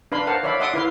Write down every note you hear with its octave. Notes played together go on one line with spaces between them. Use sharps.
D4 B4 F5 B5 C6
A#4 C5 F5 F#5 A5
C#5 D5 E5 F5 B5
D5 E5 F#5 C6 D6 D#6
E4 B4 F5 C6